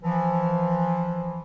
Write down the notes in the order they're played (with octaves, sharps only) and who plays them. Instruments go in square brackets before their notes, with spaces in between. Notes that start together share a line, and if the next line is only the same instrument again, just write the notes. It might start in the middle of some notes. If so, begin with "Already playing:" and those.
[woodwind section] E3 F3